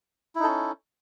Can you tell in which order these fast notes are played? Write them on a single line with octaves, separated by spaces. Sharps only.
E4 D#4 A4 C#4